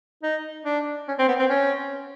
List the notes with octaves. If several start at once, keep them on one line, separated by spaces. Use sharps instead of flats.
D#4
D4
C#4
C4
B3
C4
C#4